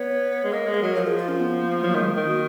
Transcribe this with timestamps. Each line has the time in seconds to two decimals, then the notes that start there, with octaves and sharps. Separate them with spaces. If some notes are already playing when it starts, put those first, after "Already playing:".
Already playing: B3 C#5
0.44 G#3
0.52 A#3 D#5
0.67 G#3
0.74 A#4
0.82 F#3
0.96 F3 A#4
1.07 G#4
1.18 F4
1.28 C#4
1.40 B3
1.62 A#3
1.83 F3 F#3
1.95 D#3 G#3
2.12 D#3 A#3
2.27 F#4